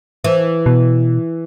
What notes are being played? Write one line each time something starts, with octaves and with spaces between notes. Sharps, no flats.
E3
B2